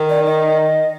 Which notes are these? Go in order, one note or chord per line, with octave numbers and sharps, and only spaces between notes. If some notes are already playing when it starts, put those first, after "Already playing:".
Already playing: D#3
D5
D#5